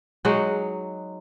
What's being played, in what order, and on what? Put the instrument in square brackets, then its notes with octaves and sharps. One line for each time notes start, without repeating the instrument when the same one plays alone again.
[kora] F#3 G#3 D#4 F#4